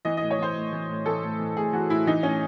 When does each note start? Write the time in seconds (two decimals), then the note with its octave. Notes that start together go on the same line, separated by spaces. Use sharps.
0.05 E3 D#5
0.17 D#5
0.22 A2
0.30 C#5
0.39 E3 C5
0.56 A2
0.72 E3
0.89 A2
1.06 E3 A4
1.22 A2
1.39 E3
1.57 A2 G#4
1.73 E3 F#4
1.90 A2 E4
2.07 E3 D#4
2.23 A2 C#4